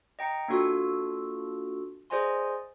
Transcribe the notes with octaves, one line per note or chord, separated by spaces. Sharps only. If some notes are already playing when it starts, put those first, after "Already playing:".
D#5 G5 A#5 C#7
A#3 D4 F4 F#4 A4
G#4 C5 D5 D#5 G#5 C6